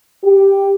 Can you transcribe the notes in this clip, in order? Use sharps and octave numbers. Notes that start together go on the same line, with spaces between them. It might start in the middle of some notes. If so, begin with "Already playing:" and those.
G4